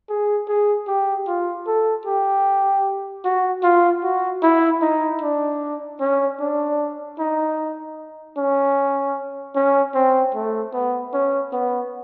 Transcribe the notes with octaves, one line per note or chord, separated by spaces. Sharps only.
G#4
G#4
G4
F4
A4
G4
F#4
F4
F#4
E4
D#4
D4
C#4
D4
D#4
C#4
C#4
C4
A3
B3
C#4
B3